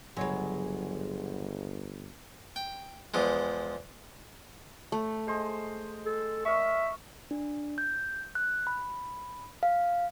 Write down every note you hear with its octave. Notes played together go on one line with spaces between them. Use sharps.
G1 C#3 F#3 G#3 C#5
G5
E2 F3 G#3
A3
G#3 C5 D#5
A4
A#4 E5 C#6
D4
G6
F#6
B5
F5